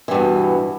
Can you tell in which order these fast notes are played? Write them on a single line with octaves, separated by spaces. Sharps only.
E3 G2 B2